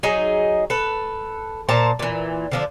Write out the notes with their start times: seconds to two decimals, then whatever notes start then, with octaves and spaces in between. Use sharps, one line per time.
0.03 F#3 D#4 G#4 D#5
0.70 A4 B4
1.69 A#2 C5 A5 A#5
1.99 A#2 E3
2.52 D3 F3 D4